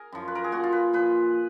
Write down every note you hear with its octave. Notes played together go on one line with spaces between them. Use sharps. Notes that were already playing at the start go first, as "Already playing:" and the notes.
Already playing: G#4 A#4
F#2 F3
B4
A#4
G#4
A#2 F3 F#4
F4
B4
A#2 F3 B4